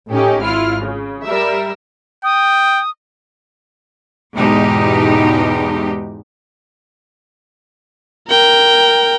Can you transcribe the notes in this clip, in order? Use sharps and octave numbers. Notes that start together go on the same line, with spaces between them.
A2 C#4 D#4 G4
G#1 E4 F4 F6
C#3
G3 A#4 E5
G5 D#6
E2 G#2 B2 G#3 D#4 G4
A#4 G5